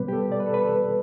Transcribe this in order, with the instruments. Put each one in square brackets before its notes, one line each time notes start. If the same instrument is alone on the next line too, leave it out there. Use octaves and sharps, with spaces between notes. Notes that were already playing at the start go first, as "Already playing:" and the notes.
Already playing: [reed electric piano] B2 G3 B3 B4
G4
A4
D5
B4
A4
B4
A4